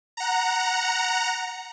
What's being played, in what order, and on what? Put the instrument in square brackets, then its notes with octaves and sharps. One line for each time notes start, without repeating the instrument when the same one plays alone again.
[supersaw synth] F#5 A#5